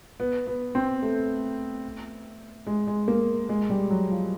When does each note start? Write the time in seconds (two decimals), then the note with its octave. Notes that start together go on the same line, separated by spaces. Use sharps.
0.20 B3
0.47 B3
0.75 C4
1.02 A3
2.67 G#3
2.87 G#3
3.08 A#3
3.49 G#3
3.70 G3
3.90 F#3
4.11 F3